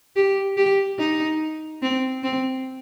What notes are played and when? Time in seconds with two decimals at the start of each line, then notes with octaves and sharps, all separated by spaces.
0.16 G4
0.57 G4
0.98 D#4
1.82 C4
2.23 C4